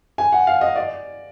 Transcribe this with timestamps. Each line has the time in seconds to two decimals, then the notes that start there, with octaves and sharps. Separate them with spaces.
0.18 G#5
0.32 F#5
0.47 F5
0.61 D#5
0.76 D5